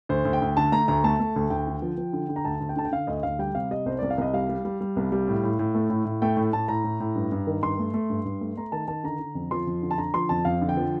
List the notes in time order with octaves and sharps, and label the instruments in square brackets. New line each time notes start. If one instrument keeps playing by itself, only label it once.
[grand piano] D2 C5
D2
G5
D2
D3 A5
A3 A#5
D2 A#5
A3 A5
A3
D2
D2 G5
D3
F3
F3
D3
D3
A#5
D2 A5
D2
G5
D3 A5
G5
D3 F5
D2 D#5
D2 F5
G3 G5
C3 F5
G3 D#5
C2 C5
C2 D5
F5
C2 D#5
G3 F5
G3
G3
G3
C2
G3
A2
A2
A2
A3
A2
A2
A3 G5
A2
A2 A5
A2 A#5
A2
A2
G2
G2
D#3
G2 C6
A3
A3
G2
G2
A3
A3 A#5
D#3 A5
D#3 A5
D3 A#5
D3
F2
F3 C6
F2
D3
A5
D3 A#5
F3 C6
F2 A5
F2 F5
D3
G5
F3